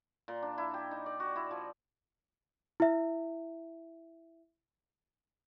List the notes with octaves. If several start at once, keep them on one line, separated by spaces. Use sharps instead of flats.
A#2
D4
E4
G4
D#4
D5
F#4
E4
F3
E4 E5